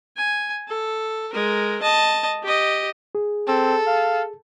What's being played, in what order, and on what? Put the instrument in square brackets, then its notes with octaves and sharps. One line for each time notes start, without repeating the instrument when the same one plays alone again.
[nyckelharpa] G#5
A4
G#3 A#4
D#5 A5
G4 D#5
[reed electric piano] G#4
[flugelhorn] C4 [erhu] A4
[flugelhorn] F5